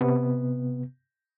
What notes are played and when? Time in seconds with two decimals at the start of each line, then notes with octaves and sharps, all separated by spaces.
0.01 C3 B3